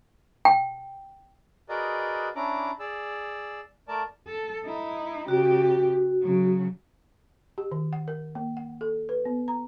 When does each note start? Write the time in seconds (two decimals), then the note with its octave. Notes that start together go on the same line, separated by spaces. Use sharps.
0.45 G5
1.69 F#4 G#4 A#4 B4 D5 D#5
2.35 C#4 D4 E4 A#5 D6
2.79 G#4 D5 E6
3.88 A3 A#4 D5 A5
4.27 A4
4.65 D#4 E4
5.28 C#3 F#4 G4
6.22 C#3 F#3
7.58 G4
7.72 D#3
7.93 F#5
8.08 A#4
8.35 A#3
8.57 F#5
8.81 A4
9.09 B4
9.25 B3
9.48 A#5